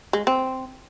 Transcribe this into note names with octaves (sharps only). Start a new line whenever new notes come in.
G#3
C4